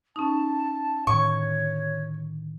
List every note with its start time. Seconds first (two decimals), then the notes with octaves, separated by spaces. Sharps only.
0.16 C#4 D#4 A5
1.07 A2 D3 D#3 C#5 C#6